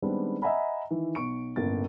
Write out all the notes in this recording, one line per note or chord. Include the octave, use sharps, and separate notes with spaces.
D#3 G3 G#3 B3 C4 D4
D#5 E5 F#5 G#5 A#5 B5
D#3 E3
B1 C#6 D7
G1 C#2 A2 A#3 A6